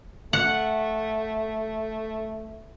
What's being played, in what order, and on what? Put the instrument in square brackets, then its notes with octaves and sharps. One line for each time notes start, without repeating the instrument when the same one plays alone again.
[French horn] A3 [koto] F#5